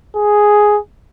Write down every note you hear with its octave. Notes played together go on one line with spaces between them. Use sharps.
G#4